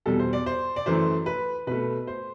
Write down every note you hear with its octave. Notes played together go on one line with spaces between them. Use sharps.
E2 B2 G3 A4
C5
D5
C5
D5
F#2 E3 A3 C5
B4
B2 A3 B4
C5